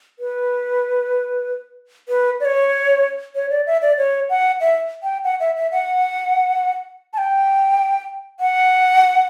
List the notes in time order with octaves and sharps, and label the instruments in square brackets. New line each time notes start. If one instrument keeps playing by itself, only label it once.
[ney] B4
B4
D5
C#5
C#5
D5
E5
D5
C#5
F#5
E5
G5
F#5
E5
E5
F#5
A5
G5
F#5